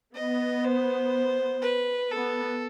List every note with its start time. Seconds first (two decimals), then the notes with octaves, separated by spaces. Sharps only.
0.15 B3 D#5
0.64 C5
1.62 B4
2.12 B3 A4